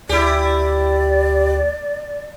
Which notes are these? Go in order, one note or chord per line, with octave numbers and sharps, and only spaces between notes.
D2 E4 G4 D5